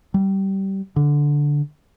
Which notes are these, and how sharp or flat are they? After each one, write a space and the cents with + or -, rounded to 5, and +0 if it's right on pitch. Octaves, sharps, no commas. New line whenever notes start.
G3 -20
D3 -5